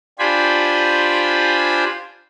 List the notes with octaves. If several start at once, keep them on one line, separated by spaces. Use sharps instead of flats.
D4 F4 G4 C5 G#5 B5